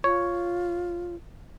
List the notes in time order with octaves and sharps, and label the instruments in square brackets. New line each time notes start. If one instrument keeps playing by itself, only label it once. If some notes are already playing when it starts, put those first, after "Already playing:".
[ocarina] F4 [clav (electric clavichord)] C#5